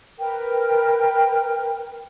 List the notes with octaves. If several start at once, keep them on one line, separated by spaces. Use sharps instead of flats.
A#4 B4 G5